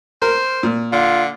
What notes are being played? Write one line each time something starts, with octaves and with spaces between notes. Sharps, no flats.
A#4 C5
A#2
D3 F4